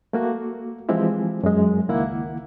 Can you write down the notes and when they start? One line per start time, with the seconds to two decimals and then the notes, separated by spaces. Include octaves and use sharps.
0.13 A3 A#3 F#4
0.89 E3 F3 G#3 C4 E4 G4
1.43 F#2 G#3
1.88 C#2 D#3 A#3 E4 F#5